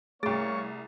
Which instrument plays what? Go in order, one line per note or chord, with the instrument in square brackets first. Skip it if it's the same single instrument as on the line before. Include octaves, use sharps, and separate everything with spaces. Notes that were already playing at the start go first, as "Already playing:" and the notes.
[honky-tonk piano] C2 A6 [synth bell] A3 [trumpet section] A#3 C#5 C#6 [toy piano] C#4 G#4